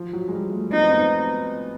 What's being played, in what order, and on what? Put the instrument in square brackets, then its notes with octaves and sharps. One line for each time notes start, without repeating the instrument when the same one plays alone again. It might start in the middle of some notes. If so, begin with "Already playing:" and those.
Already playing: [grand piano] F3
F#3
G#3
G3
A3
[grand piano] B3 [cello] D#4
[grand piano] C4
B3